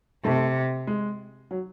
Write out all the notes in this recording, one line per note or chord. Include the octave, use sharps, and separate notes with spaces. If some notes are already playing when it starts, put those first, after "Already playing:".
C3 A3
G#3
F#3